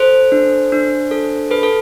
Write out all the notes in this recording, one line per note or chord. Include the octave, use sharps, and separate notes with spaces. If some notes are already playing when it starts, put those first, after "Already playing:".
Already playing: A4 C5
D4
D4
A4
A4 B4
A4